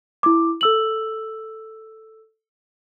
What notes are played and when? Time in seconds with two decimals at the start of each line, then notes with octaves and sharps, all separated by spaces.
0.23 E4 D6
0.61 A4 E6 F#7